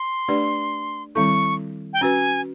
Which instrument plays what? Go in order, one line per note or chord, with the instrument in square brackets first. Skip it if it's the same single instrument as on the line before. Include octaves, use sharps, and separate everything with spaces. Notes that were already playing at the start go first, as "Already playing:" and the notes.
Already playing: [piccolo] C6
[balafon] A3 D4 G4 B4 D5
[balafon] D#3 G3 C4 E4 A4 [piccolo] C#6
[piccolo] G5
[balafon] C#4 F#4 B4 [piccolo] G#5